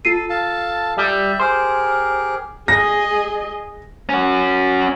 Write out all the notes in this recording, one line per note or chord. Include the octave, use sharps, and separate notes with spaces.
F4 A4 C7 D#7
A4 F5 A5
G3 E5
G4 G#4 A#4 C5
G#4 D#5 A#6
C#4 F#4